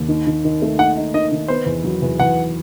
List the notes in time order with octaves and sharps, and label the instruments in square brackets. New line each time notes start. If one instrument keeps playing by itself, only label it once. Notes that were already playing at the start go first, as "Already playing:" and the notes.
Already playing: [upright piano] D#2
D#3
D#3
D#3
A3
[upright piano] D#3 [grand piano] F#5
[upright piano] D#4
[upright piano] D#3 [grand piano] D#5
[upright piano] D#3
[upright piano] B3 [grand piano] C5
[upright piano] E2
F#3
E2
[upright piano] E2 [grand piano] F#5